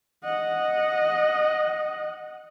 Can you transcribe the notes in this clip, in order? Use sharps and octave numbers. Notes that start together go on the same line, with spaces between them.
D#5 F#5